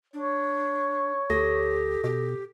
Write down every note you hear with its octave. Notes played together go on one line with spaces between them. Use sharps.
D4 C#5
D2 G4 A4 A#6
B2 G4